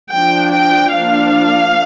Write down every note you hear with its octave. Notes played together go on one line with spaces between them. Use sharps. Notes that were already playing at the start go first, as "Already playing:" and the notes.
F3 D4 G5
G5
F3 A#3 D4 F5